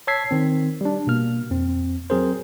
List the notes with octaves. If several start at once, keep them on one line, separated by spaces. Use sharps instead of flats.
C#5 A5 E6 G#6 B6 C7
D#3 C4
G3 D4
B2 A#3 F6
F2 C4
F#3 C4 G#4 A#4 C5